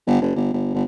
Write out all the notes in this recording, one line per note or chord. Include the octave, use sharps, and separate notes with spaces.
G1
F#1
G1
G1
G1